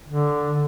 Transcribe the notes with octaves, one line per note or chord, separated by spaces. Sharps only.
D3